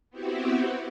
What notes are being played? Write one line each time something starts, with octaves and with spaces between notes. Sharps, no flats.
B3 C4 E4 F#4 G4